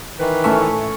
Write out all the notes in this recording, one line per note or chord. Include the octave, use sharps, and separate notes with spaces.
D#3 E3 B4
A2 A3 C#4 E5 C#6